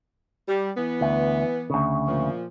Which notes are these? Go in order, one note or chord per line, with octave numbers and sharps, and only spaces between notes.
G3
E3 B3
D2
D2 C#3
A#2 F3